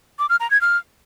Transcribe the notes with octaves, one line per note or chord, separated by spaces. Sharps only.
D6
F6
A#5
G#6
F6